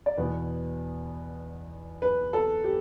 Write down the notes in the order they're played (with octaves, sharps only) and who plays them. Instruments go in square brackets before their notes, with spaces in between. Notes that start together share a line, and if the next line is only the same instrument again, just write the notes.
[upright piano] D5
E2 B2 B3 B4
B4
A4
G4